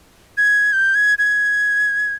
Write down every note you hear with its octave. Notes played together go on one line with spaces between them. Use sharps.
G#6
G6
G#6
G#6